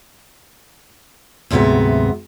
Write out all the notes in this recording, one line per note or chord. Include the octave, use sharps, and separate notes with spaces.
D2 G#2 C3 F#3 B3 E5